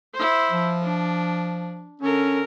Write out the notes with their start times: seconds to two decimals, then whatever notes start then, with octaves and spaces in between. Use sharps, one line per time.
0.15 E4 C5
0.50 F3
0.83 D4
2.02 D3 C#4 A#4